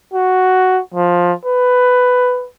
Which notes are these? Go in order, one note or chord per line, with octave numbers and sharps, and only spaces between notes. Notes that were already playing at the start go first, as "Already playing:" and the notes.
F#4
F3
B4